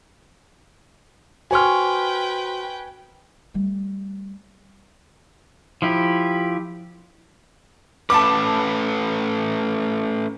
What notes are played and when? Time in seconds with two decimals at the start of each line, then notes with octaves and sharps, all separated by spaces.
1.51 F#4 B4 C5 G5 G#5 C6 C#6 F6
3.54 G3 A3
5.82 F3 E4 G4
8.10 A3 C#4 B4 A5 B5 D6